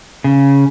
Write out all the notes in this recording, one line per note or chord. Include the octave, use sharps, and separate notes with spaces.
C#3